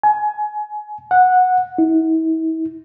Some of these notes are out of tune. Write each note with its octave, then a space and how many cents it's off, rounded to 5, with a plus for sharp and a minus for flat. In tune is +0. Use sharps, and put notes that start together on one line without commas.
G#5 +25
F#5 -10
E4 -40